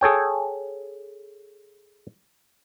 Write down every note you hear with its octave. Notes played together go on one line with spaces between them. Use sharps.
G#4 A4 C#5 G5